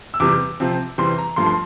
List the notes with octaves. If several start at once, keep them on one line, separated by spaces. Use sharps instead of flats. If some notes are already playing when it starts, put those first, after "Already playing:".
E6
E2 C3 G3 D6
C3 F3 C4
E2 C3 E3 G3 C4 C6
A#5
G2 F3 A3 C6
C6